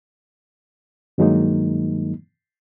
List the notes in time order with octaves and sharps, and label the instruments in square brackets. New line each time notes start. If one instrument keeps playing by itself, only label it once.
[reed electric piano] G2 D#3 F#3 G#3 A#3 D#4